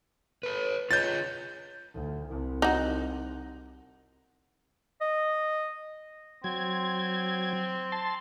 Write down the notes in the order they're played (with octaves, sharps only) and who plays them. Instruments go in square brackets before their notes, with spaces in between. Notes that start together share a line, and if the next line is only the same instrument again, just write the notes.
[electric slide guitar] A4 B4
[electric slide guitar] F4 C#5 D#5 [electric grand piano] G6 A6
[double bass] D2
C2 C3
[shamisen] D#4 F#4
[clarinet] D#5
[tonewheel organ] F#3 G#6 [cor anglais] C4
[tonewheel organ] A5 C6